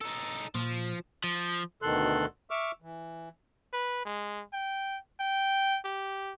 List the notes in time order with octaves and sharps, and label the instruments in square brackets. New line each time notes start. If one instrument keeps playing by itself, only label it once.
[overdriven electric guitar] D#4 A4
[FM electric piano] A#2 [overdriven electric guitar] F3
[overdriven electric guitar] F3
[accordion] D2 B2 D#3 A4 C6 F#6
E5 C#6 D6 E6 F6
E3
[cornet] B4
G#3
G5
G5
G4